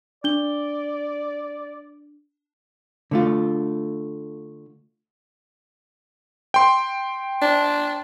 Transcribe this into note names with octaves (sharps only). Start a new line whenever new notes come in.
D4 D5 G7
D3 A3 F4
G5 C6
D4